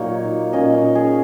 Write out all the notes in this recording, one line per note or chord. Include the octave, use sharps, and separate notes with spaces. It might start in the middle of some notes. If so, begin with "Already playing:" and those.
Already playing: A#2 F#3 A#3 D#4 C#5
A#2 A#3 C#4 D#5
C#5
G#4